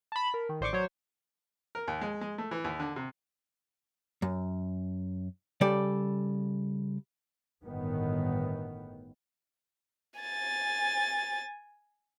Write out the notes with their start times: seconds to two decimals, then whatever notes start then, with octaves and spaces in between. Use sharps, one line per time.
0.12 A5 B5
0.34 A#4
0.49 D#3
0.61 A1 C5 D5 C#6 D6
0.73 F#3 C5 C#5
1.75 A#4
1.88 D#2
2.01 G#3
2.21 G#3
2.38 A3
2.51 E3
2.64 D#2
2.80 D3
2.96 C3
4.22 F#2
5.61 C#3 G3 A4 D5
7.64 G1 A2 D#3 B3
10.20 G#5 A6